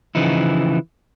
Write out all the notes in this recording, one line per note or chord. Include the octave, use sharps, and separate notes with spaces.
C#3 E3 F3 D#4 E4